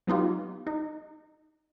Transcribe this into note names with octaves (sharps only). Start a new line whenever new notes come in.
F#3 B3 D#4 F4 G4
D#4